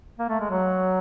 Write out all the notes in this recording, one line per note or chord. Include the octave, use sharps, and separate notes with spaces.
A#3
A3
G#3
F#3